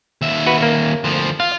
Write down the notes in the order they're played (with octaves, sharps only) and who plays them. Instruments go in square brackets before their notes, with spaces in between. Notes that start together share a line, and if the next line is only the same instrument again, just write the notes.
[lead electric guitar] D#2 E5
[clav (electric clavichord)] F#4 B4
A#3
[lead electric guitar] D2 F3
[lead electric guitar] F4 [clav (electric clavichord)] F5